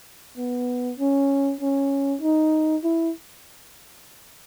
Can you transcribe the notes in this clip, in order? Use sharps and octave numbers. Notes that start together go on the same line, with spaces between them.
B3
C#4
C#4
D#4
E4